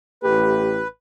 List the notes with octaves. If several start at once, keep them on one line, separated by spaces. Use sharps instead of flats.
A1 A3 G4 B4